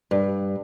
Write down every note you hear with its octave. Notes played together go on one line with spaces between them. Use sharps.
G2